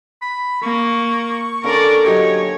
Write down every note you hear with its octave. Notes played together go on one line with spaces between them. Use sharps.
B5
A#3 C#6
D3 A#3 C#4 A#4 D5
F#3 D#4 G4 C#5